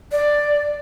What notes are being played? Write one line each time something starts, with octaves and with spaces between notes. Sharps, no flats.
D5